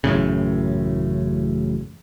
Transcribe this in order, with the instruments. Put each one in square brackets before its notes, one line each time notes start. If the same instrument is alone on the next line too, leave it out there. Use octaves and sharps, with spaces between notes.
[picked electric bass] A1 F#2 A2 C#3